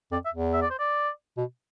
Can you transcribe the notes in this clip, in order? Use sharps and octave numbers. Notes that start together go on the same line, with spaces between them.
F2 D5
E5
E2
E5
D5
C5
D5
B2